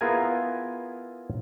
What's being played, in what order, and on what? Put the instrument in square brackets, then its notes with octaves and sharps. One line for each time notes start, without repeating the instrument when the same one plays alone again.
[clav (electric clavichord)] B3 E4 F4 G#4 A#4 G#5